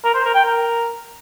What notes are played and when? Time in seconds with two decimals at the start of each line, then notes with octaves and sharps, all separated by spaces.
0.04 A#4
0.14 C5
0.24 A#4
0.35 G5
0.45 A#4